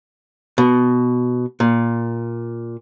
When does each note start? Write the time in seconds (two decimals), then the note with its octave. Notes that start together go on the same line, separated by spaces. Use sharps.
0.58 B2
1.60 A#2